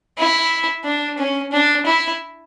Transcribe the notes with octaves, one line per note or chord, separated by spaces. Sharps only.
E4
D4
C#4
D4
E4